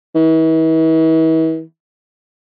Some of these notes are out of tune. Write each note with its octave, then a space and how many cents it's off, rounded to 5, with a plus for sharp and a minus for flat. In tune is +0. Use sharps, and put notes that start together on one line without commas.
E3 -40